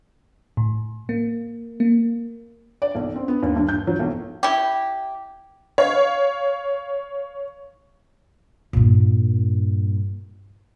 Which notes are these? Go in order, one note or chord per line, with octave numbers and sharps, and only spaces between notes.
A2
A#3
A#3
D5
B1
C4
B3
D#2
G2
G6
F#3
B1
E4 G4
C#5 F5
G2 A#2